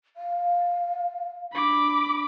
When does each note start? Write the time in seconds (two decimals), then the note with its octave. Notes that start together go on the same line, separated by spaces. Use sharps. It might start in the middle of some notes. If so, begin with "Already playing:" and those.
0.16 F5
1.53 D4 B5 D6